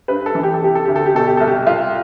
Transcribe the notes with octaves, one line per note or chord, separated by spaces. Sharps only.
G2 B4
A4
E3
G4
A4
C3 G4
A4
D2 G4
A4
G4
B2 A4
G4
C2 A4
G4
C2 F4